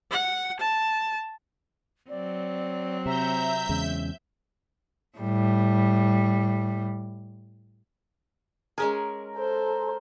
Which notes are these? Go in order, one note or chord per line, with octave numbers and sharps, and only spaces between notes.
F#5
A5
F#3 C4 D5
C3 E5 A#5 G6
E2 C#3 G#3
A2 G3
G#3 C#4 G#4 A#4
A4 C5